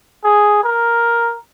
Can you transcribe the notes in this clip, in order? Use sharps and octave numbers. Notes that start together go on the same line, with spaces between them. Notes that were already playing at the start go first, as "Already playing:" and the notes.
G#4
A#4